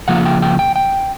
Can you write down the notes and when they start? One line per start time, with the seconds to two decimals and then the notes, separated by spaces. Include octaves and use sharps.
0.08 C#3 F3 A#3 F4 F#5
0.25 G5
0.42 G5
0.59 G5
0.76 G5